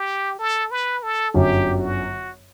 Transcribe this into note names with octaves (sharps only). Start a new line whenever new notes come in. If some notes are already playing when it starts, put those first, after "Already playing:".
Already playing: G4
A4
B4
A4
G1 F#2 D3 G4
F#4